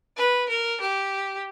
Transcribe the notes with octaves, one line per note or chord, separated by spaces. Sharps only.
B4
A#4
G4